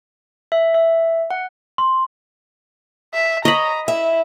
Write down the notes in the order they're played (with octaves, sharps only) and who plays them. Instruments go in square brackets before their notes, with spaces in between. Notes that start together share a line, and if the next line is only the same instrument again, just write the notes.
[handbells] E5
E5
F#5
[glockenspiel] C6
[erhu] E5
[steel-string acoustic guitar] C#5 [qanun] D#5 B5 [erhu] A#5
[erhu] E4 [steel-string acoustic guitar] E5